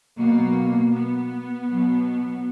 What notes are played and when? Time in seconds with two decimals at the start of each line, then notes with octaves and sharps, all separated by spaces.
0.18 B2 F#3 A#3
0.93 B3
1.67 B2 F#3